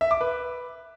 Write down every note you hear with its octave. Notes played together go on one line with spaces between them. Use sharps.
E5
D6
B4